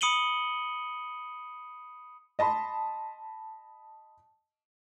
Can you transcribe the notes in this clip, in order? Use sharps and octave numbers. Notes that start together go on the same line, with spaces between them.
B5 D#6 C#7 D#7 F#7 G7
D#5 A5 B5 C6